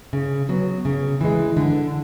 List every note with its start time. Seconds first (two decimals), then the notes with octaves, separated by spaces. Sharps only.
0.13 C#3
0.49 F#3 B3
0.85 C#3
1.21 E3 G#3
1.57 D3